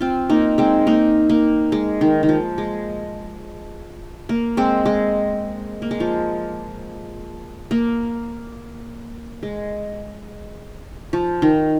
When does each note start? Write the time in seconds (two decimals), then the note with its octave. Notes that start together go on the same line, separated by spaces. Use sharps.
0.01 C4 F4
0.30 A#3 D#4
0.58 G#3 C4
0.87 A#3 D#4
1.29 A#3
1.72 G#3
2.01 D#3
2.23 D#3
2.29 F3
2.58 G#3
4.29 A#3
4.57 G#3 C4
4.86 G#3
5.82 A#3
5.91 G#3
6.00 F3
7.71 A#3
9.43 G#3
11.13 F3
11.42 D#3